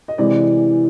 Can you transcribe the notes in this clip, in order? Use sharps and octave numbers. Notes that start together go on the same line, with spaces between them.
D#5
C3 E3 G#3 D5